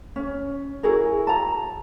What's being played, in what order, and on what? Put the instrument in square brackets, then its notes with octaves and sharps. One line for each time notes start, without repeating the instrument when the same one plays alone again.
[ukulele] C#4
E4 F#4 G#4 A#4
A5 A#5